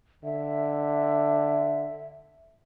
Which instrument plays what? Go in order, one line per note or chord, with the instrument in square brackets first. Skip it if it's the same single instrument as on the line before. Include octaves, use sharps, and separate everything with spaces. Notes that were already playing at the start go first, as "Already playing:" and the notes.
[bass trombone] D3 [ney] E5